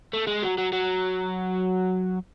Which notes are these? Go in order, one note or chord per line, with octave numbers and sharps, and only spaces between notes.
A3
G#3
F#3
F#3
F#3